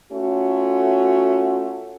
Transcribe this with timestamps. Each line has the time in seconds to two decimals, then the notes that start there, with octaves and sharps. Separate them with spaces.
0.12 A3 C#4 F4 F#4